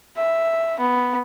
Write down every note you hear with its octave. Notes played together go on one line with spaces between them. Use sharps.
E5
B3